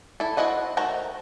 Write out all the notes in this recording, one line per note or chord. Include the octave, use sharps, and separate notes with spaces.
E4 A4
C4 E4 F#4 D#5 F#5
D#3 A3 F#4 C5 A#5